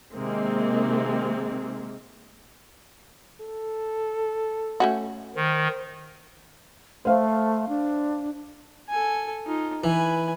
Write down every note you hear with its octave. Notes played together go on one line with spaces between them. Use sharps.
C3 D#3 G#3 A#3 C4
A4
A3 C#4 F#4
D#3 C5
A3 C5 F5
D4
A4 G#5
D#4 F4
E3 B4 G#5